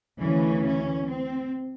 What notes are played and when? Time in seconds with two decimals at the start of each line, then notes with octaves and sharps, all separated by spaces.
0.20 D2 C#3 E3 C#4
0.63 C#4
1.07 C4